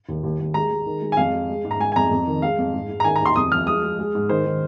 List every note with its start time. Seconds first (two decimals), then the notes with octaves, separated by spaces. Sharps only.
0.09 D#2
0.24 D#2
0.40 D#2
0.54 G#3 A#5
0.71 G#3
0.86 D#3
1.01 G#3
1.12 G#5
1.17 F2 F5
1.33 G#3
1.49 G#3
1.65 G#2
1.71 A#5
1.80 G#3 G#5
1.92 G#5
1.96 F2 A#5
2.11 F2
2.27 D#3
2.42 G#3 F5
2.59 F2
2.73 G#2
2.89 G#2
3.00 A#5
3.04 D#3 G#5
3.16 A#5
3.21 D#2 C6
3.36 F2 D#6
3.52 F3 F6
3.67 G#3 D#6
3.83 G#3
3.99 G#3
4.15 G#2
4.29 D#3 C5
4.46 D#3